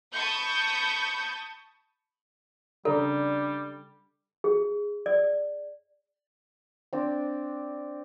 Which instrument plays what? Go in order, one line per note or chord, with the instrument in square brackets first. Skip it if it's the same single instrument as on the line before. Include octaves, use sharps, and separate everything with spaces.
[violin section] A5 B5 C#6 D#6 G6
[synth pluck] C#3 D4 A#5 [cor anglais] G3 [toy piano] A4 [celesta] D5
[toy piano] G#4
D5
[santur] C4 D4